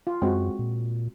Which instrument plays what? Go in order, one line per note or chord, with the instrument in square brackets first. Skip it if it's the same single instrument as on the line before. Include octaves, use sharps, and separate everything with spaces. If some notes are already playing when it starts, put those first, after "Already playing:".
[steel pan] F4
[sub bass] F#2 [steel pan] G#3 C4 F#4
[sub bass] A#2